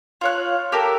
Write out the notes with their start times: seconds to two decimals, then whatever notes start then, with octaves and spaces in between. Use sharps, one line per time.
0.21 F4 C#5 F#6
0.72 G4 A4 A#4